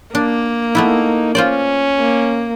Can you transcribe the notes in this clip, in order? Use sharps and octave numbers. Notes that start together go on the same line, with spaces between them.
A#3 D4
A3 B3 D#4 E4
C#4 F4 C5 D5
A#3